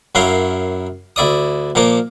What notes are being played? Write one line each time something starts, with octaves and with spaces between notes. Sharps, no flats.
F#2 C#4 E4 A#4 F5 C6
D2 E4 D5 D#6
A#2 F3 A#3 A#4 D6